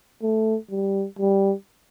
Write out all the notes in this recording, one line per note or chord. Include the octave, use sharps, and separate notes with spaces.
A3
G3
G3